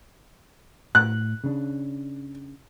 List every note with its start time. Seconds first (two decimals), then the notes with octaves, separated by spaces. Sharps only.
0.95 A2 F#6
1.44 C#3 D4